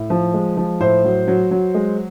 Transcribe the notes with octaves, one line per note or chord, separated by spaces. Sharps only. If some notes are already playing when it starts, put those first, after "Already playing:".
Already playing: A2
F3
G#3
F3
A2 C5
F#3
F#3
F#3
G#3